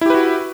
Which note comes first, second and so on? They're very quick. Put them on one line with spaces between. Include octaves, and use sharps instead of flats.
E4 G4 B4 F#4